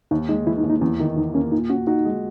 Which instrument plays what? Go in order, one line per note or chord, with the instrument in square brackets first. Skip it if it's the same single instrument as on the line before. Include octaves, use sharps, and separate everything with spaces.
[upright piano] D#2 [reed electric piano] D#4
[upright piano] G#3 [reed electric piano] D#4
[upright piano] E3 [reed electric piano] E4
[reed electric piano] D#4
[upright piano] D#2
[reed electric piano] D#4
[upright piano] E2 [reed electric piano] C#4
[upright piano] D#3 [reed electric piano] D#4
[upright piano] E2 [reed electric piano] D#4
[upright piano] A#3 [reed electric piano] C#4
[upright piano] A#2 [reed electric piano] D#4
[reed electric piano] C#4 [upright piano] F#4
[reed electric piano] D#4 [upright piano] F#4
[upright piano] G#3